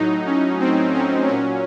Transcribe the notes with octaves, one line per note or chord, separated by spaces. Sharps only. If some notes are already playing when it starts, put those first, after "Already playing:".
Already playing: A2 F#3 D#4
C#4
C4
C#4
A#2 F#3 C#4